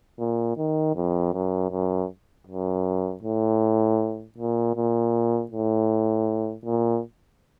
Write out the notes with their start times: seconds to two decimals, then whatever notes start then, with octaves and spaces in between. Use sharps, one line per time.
0.19 A#2
0.57 D#3
0.95 F2
1.33 F#2
1.71 F#2
2.47 F#2
3.23 A2
4.38 A#2
4.75 A#2
5.51 A2
6.65 A#2